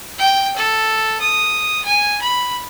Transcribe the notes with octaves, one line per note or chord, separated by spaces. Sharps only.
G5
A4
D#6
G#5
B5